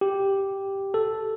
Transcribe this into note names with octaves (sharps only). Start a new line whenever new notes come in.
G4
A4